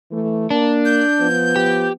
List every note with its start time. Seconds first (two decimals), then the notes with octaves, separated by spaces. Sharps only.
0.11 E3 A3
0.50 A#3 D4
0.85 G6
1.20 F3 B3
1.56 G4